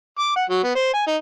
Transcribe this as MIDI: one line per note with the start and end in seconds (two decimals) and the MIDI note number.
0.19 0.35 86
0.37 0.45 78
0.50 0.61 54
0.64 0.71 59
0.75 0.93 72
0.94 1.07 80
1.07 1.16 63